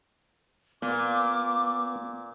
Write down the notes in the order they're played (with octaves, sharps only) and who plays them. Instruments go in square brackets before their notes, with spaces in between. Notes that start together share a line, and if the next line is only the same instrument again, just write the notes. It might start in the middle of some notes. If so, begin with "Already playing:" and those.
[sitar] A#2 [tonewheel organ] B3 [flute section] D6